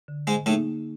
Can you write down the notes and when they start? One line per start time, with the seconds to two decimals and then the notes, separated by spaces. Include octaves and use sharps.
0.08 D3
0.27 G#2 G#3
0.46 A2 A3 A#3 D#4 G#4